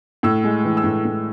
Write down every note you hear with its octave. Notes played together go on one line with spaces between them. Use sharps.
A2 E6
G#3
E3
E6
A2
A2